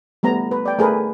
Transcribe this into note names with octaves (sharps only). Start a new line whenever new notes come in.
G3 A3 B3 A#5
B4
D5 G5
A3 G#4 A#4 B4